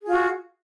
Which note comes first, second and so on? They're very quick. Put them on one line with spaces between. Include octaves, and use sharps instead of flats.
G#4 F4 F#4